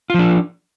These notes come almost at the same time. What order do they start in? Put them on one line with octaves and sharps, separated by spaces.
F4 F3 D4